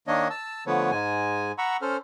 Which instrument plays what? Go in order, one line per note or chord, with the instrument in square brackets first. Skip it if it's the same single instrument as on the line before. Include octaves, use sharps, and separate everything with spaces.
[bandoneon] D#3 A#3 D4 C#5 D#5
A5 E6
D3 F3 A3 B3 B4 C#5
G#2 G#3 G#5
F#5 A#5 B5 C#6 E6
C#4 A4 C5 F6